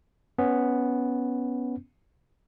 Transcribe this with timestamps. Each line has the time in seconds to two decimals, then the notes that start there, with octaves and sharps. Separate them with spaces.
0.38 B3 C#4